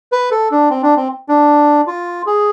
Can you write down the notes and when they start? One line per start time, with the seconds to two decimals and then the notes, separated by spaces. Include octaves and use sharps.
0.12 B4
0.31 A4
0.51 D4
0.70 C4
0.83 D4
0.96 C4
1.29 D4
1.87 F4
2.26 G#4